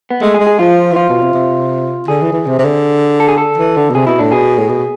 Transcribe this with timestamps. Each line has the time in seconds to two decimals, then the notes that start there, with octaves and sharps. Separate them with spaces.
0.11 B3
0.21 G#3 A3
0.34 G#4
0.40 G#3
0.47 G#4
0.59 F3 F4
0.92 E3
0.96 F3 F4
1.09 B2
1.21 C3
1.34 C3
2.08 D3 G#4
2.21 E3
2.32 E3
2.46 C3
2.59 C3
2.64 D3
3.20 A4
3.29 G#4
3.38 A4
3.58 E3
3.77 D3
3.90 B2
3.95 C3 G#4
4.07 B2 E4
4.19 A2 D4
4.32 B2 G#4
4.58 A2
4.69 B2